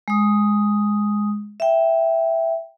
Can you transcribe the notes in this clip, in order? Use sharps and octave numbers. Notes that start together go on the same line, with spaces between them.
G#3 D#6
E5 G5